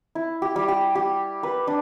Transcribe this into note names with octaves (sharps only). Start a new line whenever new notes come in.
E4
G4
G3
G4
G4
B4
D4